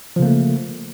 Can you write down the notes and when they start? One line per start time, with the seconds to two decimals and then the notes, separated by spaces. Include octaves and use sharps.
0.16 F3
0.19 C#3
0.22 A#3
0.25 A3